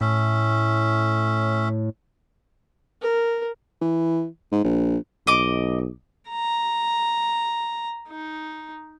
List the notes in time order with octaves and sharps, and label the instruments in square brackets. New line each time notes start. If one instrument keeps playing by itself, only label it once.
[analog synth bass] A2 [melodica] C#4 E5
[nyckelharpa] A#4
[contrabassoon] E3
G#2
A#1
[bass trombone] B1 [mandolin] D#5 D6
[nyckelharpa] A#5
D#4